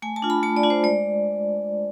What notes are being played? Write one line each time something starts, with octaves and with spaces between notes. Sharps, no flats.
A3 G#5
A5
D4 F4
B5
A3 A5
D5
D4 F4
C5
G#3 D5